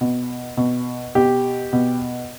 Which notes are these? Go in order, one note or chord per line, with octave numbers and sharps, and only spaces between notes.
B2
B2
B2 G4
B2